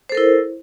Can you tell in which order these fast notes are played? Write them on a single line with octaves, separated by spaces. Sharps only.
C5 A4 A#4 E4